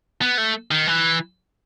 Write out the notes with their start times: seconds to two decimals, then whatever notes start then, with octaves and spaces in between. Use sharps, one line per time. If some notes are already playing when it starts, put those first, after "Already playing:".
0.21 B3
0.38 A3
0.71 D#3
0.87 E3